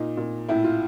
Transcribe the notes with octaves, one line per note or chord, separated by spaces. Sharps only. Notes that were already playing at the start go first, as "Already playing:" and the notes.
Already playing: A#2 D#4
A#2
A2 E4
F4